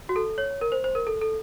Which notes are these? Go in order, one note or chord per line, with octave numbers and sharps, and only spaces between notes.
F#4
A4
C#5
A#4
C5
C5
A#4
A4
A4